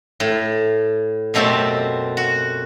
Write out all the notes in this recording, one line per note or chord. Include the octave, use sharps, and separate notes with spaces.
A2
F#2 B2 A3 C4 G4 A5
F#4